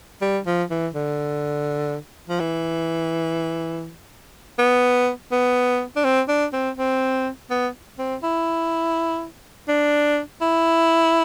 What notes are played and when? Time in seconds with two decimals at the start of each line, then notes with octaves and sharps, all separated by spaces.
0.22 G3
0.46 F3
0.71 E3
0.95 D3
2.29 F3
2.40 E3
4.59 B3
5.32 B3
5.96 D4
6.04 C4
6.28 D4
6.53 C4
6.78 C4
7.51 B3
7.99 C4
8.23 E4
9.68 D4
10.41 E4